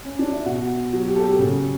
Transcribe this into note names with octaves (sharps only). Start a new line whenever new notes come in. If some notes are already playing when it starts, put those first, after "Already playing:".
C#4
D4
E4
B2 F#4
F#3
G4
A4
G4
C#3